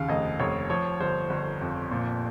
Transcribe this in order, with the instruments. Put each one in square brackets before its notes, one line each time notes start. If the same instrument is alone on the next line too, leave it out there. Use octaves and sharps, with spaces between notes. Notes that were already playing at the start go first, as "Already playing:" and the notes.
Already playing: [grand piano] D#2 C#3 F5
F1 D#5
F1 C#5
F3 C#5
G1 C5
G1
F2
A#2